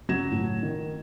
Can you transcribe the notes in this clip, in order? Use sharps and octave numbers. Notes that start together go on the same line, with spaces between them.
C#3 F#3 G#6 A#6 E7
A2
D#3